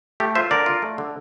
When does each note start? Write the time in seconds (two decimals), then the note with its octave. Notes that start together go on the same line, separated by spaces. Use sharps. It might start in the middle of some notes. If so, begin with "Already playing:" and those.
0.20 A3 G4
0.35 F4 C5 E5
0.51 D3 A#4 D5
0.66 F4
0.82 A3
0.98 D3